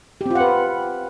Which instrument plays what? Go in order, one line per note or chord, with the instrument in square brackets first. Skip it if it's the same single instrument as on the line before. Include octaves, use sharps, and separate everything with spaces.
[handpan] G4
C4
F4
F#5
B4